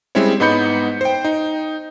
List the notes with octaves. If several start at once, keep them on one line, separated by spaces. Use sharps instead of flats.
G3 G#3 C4 C#4 E4 C#5
G#2 B3 D#4 B5 G6 C#7
C5 G5
D#4